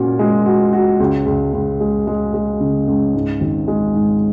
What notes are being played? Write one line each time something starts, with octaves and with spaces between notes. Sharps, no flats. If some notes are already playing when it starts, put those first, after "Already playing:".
Already playing: A#2 C#4 F#4
G#3
F#4
F#4
C#2
C#2
C#2
G#3
G#3
G#3
C#3
C#2
G#2
G#1
G#3
G#2